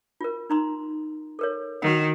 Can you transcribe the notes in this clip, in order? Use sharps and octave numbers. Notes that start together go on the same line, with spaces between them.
F4 A#4
D#4 A#5 C6
A4 A#4 C#5
D#3 F#4 A#4 F#5